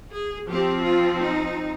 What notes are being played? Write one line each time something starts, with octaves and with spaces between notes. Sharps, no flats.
G#4
F3 C4 G4
F4
D#4